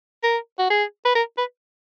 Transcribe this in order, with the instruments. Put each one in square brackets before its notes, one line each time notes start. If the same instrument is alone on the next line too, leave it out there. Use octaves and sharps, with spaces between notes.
[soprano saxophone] A#4
F#4
G#4
B4
A#4
B4